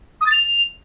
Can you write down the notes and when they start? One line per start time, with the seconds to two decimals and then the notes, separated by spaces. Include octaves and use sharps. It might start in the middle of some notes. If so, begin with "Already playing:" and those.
0.21 D#6
0.26 A6
0.32 F7